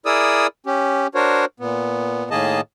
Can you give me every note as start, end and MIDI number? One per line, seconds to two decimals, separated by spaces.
0.06 0.47 64
0.06 0.47 68
0.06 0.47 70
0.06 0.47 74
0.06 0.47 87
0.06 0.47 88
0.66 1.07 61
0.66 1.07 67
1.15 1.45 62
1.15 1.45 66
1.15 1.45 70
1.15 1.45 72
1.15 1.45 73
1.60 2.29 46
1.60 2.29 59
2.31 2.61 45
2.31 2.61 51
2.31 2.61 58
2.31 2.61 68
2.31 2.61 75
2.31 2.61 81